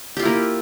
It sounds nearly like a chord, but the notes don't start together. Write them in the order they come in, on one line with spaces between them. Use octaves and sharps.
G4 F4 E4 A#3